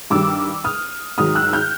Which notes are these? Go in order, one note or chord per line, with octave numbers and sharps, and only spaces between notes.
G2 D#3 G3 D6 E6
D#6 F6
G#2 D#3 F#3 D#6 F6
E6 F#6
F6 G6